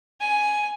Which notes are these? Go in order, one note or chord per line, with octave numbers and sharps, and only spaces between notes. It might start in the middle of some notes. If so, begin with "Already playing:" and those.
G#5